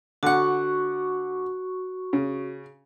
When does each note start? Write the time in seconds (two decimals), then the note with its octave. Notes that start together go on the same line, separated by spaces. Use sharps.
0.23 D3 F#4 F#5 C#6
2.13 C#3